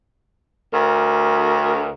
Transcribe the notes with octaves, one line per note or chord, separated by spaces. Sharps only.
D2 A#4